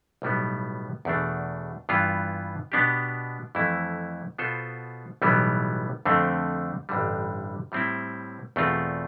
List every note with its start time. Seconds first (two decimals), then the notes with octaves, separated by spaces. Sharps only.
0.22 B1 A2 G3 B3
1.05 E2 B2 A3 D4
1.89 G2 E3 B3 F4
2.72 B2 B3 D4 G4
3.55 F2 E3 A3 E4
4.38 B2 B3 F4 A4 C5
5.22 B1 A2 E3 G3 B3
6.05 F2 D3 A3 C4
6.89 A1 G2 D3 G3
7.72 A2 G3 C4 E4
8.56 E2 B2 A3 C4 F4